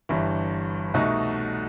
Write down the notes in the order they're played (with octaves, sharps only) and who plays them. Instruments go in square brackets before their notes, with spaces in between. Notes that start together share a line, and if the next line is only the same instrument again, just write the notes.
[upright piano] G1 G2 E3
C2 B2 A3 D#4 F#4